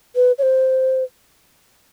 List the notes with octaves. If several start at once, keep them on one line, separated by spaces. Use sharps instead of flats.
B4
C#5
C5